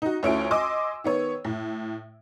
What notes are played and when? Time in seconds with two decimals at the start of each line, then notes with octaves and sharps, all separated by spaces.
0.02 D#4 F#4
0.23 D2 A3 C#4 E4 F4 D7
0.51 D#5 G#5 C6 D6 E6
1.04 D#3 B3 C#5
1.45 A2